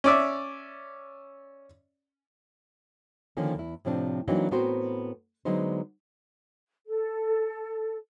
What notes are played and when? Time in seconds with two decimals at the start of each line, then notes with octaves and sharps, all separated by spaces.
0.04 C#4 D5 E5
3.37 D3 D#3 F3 A#3 C#4
3.55 E2 E4
3.85 A2 C3 F3 C4 D4
4.28 E3 F#3 A#3 C4 D4 D#4
4.51 A2 B3 C4 F#4 A#4 C5
5.45 D3 F#3 G#3 B3 D#4 C5
6.87 A4